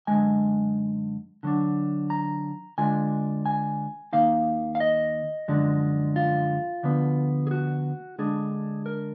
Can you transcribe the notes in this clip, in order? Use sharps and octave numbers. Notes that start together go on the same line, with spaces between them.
F#2 D3 G#3 G#5
D3 F#3 D4
A#5
D3 G#3 D4 F4 G#5
G#5
D#2 D#3 A#3 D#4 F5
F5
D#5
F#2 D3 F3 G#3 D4
F4
D2 D3 F3 B3
G#4
F#4
D3 G#3 D4 G#4
A#4